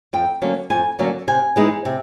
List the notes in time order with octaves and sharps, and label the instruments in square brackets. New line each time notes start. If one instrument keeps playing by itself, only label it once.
[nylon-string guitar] F2 G5
D3 F#3 A#3 C#4
F2 G#5
D3 F#3 A#3 C#4
C3 G#5
E3 G#3 B3 D#4
C3